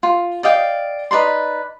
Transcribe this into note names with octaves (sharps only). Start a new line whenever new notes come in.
F4
D5 D#5 F5 G5
D#4 B4 D5 C6